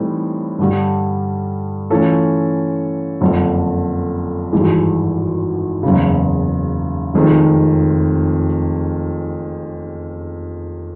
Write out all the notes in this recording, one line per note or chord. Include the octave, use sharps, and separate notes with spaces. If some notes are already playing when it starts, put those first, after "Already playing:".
Already playing: A2 E3 G3 C4 D#4
G2 D3 G3
E3 A3 C#4 F4 A4
F#1 F2 D3
G#1 G2 E3 G#3
F#1 E2 C#3
F1 F2 C3 D#3 G#3